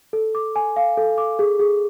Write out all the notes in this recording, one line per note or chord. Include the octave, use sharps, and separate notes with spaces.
A4
D6
G#5
F5
A4
D6
G#4
G#4